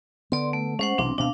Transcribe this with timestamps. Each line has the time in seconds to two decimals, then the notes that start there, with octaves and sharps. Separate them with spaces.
0.32 D3 B3 D5 C6
0.53 A3
0.79 G#3 C#4 C5 F#5
0.98 B1 C3 E3 C4 D4
1.18 D2 B2 C4 D4 F5